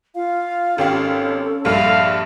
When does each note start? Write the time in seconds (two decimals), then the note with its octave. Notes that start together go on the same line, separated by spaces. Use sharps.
0.15 F4 F5
0.78 G#1 C#4 G4 A4 F5
1.65 A#1 G2 E5 F5